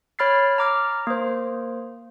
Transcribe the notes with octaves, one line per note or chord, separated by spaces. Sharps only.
C#5 B5 F6 A6 C7
A#5 D6 F6
A#3 C5